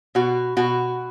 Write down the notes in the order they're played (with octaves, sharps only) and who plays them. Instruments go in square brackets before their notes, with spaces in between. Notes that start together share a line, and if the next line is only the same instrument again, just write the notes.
[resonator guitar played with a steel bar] B2 F#4
B2 F#4